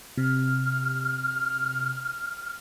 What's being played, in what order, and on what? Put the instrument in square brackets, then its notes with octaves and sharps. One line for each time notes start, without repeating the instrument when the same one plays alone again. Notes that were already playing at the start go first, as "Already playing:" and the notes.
[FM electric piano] C3 [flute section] F6